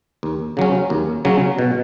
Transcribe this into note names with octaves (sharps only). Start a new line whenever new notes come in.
D#2
C#3 F#3 C#4
D#2
C#3 F#3 C#4
B2